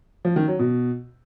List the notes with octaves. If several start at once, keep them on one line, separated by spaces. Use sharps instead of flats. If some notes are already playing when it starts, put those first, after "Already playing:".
F3
D#3
F#3
B2